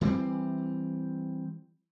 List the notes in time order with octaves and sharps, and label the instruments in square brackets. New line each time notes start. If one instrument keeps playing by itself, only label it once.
[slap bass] E3 G3 B3 C4